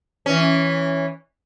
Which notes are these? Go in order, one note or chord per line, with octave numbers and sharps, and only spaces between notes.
E3 C#4